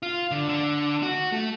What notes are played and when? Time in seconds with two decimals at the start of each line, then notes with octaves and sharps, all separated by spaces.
0.02 F4
0.31 D3
0.49 D3
1.03 F#4
1.32 A3